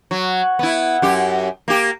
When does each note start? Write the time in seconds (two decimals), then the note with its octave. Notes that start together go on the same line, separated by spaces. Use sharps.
0.11 F#3
0.59 B3 E4
1.02 F#2 G4
1.68 A#3 G4